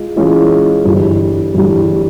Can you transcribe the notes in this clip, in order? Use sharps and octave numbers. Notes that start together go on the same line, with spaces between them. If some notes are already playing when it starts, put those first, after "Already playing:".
Already playing: G#3 F4
E3 G#3 C#4 F4
G1 G2 E3 G3
G1 G2 E3 G3